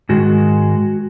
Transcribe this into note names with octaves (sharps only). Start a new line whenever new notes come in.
G#2 D#3 G#3 F#4